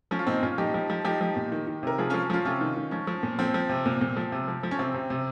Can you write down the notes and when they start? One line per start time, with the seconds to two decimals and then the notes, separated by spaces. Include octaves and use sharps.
0.11 F3 C#4
0.19 F4
0.27 A#2 C4 D#4
0.43 A#2 C#4 F4
0.58 F3 D#4 G4
0.74 F3
0.90 F3
1.05 F3 D#4 G4
1.21 F3
1.36 A#2
1.52 D#3
1.67 D#3
1.83 C3 A#4
1.98 F3 F4 G#4
2.10 F3 C#4 F4
2.30 F3 C#4 F4
2.45 C3 C#4 F4
2.61 D#3
2.76 D#3
2.91 F3 C#4
3.07 F3
3.23 A#2
3.39 F3 C4
3.54 F3
3.69 C3
3.86 A#2
4.01 A#2
4.17 F3
4.32 C3
4.48 F3
4.63 F3
4.71 C#4
4.79 C3 C4
4.94 C3
5.10 C3